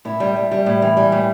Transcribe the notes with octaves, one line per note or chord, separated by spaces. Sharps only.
A2 E4
G3
G3
G3
A2
E3
G3
A2